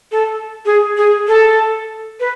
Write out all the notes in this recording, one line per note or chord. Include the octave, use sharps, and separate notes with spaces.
A4
G#4
G#4
A4
B4